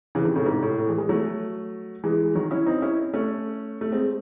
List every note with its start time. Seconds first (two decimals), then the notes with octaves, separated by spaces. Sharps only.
0.15 C#3 E3
0.25 C3 D#3
0.36 A2 C#3
0.46 G#2 C3
0.63 A2
0.78 A2
0.88 E3 G#3
0.98 E3 G#3
1.09 F#3 A3
2.04 E3 G#3
2.35 D#3 F#3
2.51 C#4 E4
2.66 C4 D#4
2.82 C#4 E4
3.13 A3 C#4
3.81 A3
3.92 G#3 C4